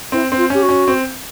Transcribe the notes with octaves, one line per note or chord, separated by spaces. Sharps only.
C4 E4
C4
F4
C#4 G4
F#4
C#4
C4